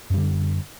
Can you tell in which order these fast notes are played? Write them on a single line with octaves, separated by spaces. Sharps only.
F#2 G3 D3